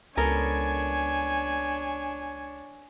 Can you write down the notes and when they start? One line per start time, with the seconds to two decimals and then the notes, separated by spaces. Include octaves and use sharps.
0.17 C#2 B3 D4 A4 A#4 C#5 G#5